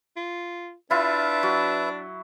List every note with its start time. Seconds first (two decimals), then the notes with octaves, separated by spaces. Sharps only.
0.16 F4
0.90 D4 E4 F4 B4 E5
1.43 F#3